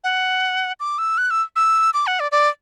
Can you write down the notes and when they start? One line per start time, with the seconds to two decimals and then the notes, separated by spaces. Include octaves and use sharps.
0.04 F#5
0.80 D6
0.98 E6
1.18 F#6
1.31 E6
1.56 E6
1.94 D6
2.07 F#5
2.20 D5
2.32 D5